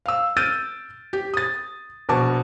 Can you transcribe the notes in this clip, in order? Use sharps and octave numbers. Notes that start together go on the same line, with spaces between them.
F5 E6
E6 F6 G6 A6 D7 D#7
G4
D#6 A6
A#1 B2 F#4 A5 D6